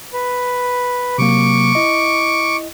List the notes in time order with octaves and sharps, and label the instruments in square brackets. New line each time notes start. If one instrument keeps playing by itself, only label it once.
[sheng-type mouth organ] B4
[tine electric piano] C3 F#3 A#3 [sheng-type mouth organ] C#6 D6
[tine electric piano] E4 D#5